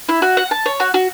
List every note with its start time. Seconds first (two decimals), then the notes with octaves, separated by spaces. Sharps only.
0.09 E4
0.22 F#4
0.37 F#5
0.51 A5
0.66 C#5
0.80 F#4
0.94 F#4